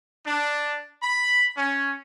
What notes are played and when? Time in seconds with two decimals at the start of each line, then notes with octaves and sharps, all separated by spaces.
0.25 D4
1.02 B5
1.56 C#4